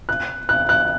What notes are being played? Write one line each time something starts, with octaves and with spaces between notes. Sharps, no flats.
F#6
F#6
F#6